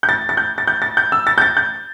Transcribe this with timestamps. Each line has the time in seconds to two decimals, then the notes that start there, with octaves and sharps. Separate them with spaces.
0.03 G6
0.09 A6
0.29 A6
0.37 G6
0.58 A6
0.67 G6
0.82 A6
0.97 G6
1.12 E6
1.27 A6
1.38 G6
1.41 A6
1.57 G6